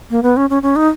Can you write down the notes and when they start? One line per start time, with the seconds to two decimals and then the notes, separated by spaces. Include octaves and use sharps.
0.11 A#3
0.23 B3
0.37 C#4
0.50 C#4
0.63 C#4
0.76 D#4